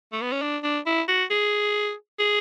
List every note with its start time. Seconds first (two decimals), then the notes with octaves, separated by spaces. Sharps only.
0.13 A3
0.21 B3
0.32 C#4
0.42 D4
0.63 D4
0.86 E4
1.08 F#4
1.30 G#4
2.19 G#4